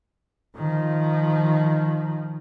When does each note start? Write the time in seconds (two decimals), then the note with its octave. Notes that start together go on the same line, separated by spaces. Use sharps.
0.56 D#3 F3